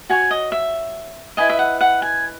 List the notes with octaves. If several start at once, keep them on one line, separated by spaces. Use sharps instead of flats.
F#4 C#5 G#5
D#5
E5
E4 B4 D#5 G#5
E5
F#5
F#5
G#5